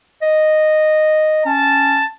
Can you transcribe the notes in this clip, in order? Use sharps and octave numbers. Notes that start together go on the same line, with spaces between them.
D#5
C#4 A5